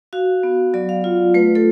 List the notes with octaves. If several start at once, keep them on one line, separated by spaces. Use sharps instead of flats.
F#4 F5
B3
F#3 D5
F5
F4
A3 B4
A4